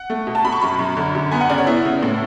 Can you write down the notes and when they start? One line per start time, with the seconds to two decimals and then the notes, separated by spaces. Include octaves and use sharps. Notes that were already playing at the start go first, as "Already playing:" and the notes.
Already playing: F#5
0.10 A3
0.27 B2
0.35 A5
0.45 B2 B5
0.52 C#6
0.61 F#2 B5
0.79 F#2
0.97 D3
1.15 F#2
1.31 B3 G#5
1.41 F#5
1.49 C#3 D5
1.58 C#5
1.67 B3 E4
1.85 C#3
2.03 A2